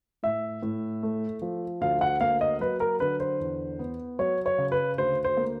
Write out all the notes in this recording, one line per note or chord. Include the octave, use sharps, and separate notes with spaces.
A2 E5
A2
A3
F3
D2 F5
F#5
A#3 F5
D#5
F#3 B4
A#4
D3 B4
C5
E2
B3
F#3 C#5
C#5
C#3
B4
D2 C5
C5
A#3